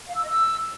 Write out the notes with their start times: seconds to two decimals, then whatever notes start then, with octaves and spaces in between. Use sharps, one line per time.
0.07 F5
0.15 E6
0.23 D#5
0.30 E6